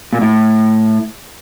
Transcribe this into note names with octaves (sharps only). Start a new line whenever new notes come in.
A#2
A2